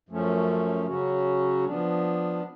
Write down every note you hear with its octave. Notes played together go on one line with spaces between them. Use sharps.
F#2 F3 A3 C#4
C#3 F#3 C#4 F#4
F3 B3 D4